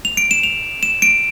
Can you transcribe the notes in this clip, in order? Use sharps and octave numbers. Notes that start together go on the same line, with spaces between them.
F7
D7
E7
F7
E7
D7